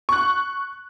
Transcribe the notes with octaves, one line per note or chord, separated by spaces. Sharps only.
C#6 F#6